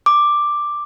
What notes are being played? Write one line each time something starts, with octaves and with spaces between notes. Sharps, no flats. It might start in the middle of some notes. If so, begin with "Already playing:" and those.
D6